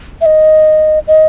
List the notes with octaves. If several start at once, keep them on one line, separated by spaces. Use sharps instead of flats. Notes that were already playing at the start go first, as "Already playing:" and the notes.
E5
D#5
D#5